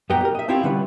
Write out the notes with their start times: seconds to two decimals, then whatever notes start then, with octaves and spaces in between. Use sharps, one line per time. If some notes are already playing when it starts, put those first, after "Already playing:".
0.10 F#2 A#2 B3 B4 G5 A#5
0.21 G4 A#4
0.35 D#5 E5
0.48 A2 C4 E4 F4 G4
0.63 D3 G3 C#4 B4